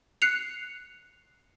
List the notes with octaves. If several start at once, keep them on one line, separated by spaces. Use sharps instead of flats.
F#6 C7 C#7 F7